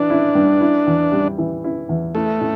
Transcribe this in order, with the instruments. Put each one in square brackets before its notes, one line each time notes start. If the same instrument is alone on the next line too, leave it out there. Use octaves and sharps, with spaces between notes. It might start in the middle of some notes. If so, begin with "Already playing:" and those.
Already playing: [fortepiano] E3 [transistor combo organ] D4
[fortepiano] E4
G2
E4
E2
G3
E3
E4
E2
[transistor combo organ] A3 [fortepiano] E4
[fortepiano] A2